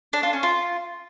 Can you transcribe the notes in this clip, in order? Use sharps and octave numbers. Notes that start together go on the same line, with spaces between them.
D4
F4
C#4
F4